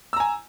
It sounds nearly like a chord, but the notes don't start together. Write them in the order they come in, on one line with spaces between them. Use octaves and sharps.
E6 A#5 G#5